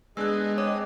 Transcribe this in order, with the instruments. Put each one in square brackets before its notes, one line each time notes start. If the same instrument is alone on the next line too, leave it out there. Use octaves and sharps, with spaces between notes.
[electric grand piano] G#3 B3 D4 [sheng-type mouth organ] G#4 D#5 [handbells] E6 F#6
[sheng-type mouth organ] C4 D#6 [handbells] C#5 D#5 D6